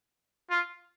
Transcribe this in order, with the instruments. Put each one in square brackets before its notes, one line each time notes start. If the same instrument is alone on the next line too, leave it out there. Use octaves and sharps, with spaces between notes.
[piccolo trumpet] F4